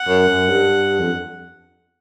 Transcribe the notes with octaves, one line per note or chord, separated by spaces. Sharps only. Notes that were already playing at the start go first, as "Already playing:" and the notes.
Already playing: F#5
F#2
F#2
G2
F2